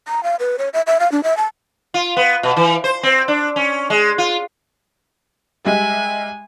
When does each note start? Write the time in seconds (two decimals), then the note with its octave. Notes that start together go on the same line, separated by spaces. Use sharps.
0.08 A#5
0.24 F5
0.40 B4
0.59 C#5
0.74 E5
0.87 E5
1.00 F5
1.12 D4
1.24 E5
1.37 A5
1.94 F4
2.17 B3
2.43 B2
2.57 E3
2.84 C5
3.03 C4
3.28 D4
3.56 C#4
3.90 G#3
4.18 F4
5.65 G3 G#3 E5 G#5